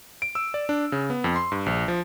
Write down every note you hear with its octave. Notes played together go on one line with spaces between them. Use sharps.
D7
E6
D5
D4
C#3
B3
F2
C6
G2
A#1
F3